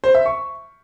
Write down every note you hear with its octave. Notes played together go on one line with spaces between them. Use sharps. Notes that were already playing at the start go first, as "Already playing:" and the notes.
C5
E5
C#6